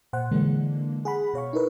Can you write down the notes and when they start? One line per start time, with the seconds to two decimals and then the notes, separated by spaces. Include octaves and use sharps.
0.13 A#2 C5 F#5
0.31 D3 E3 G#3 A#3 D4
1.05 G#4 F#5 B5
1.34 B2 C#5 F5 C#6
1.53 D#4 E4 A#4 B4